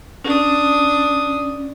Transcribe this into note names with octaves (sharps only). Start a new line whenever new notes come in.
C#4 D4 D#6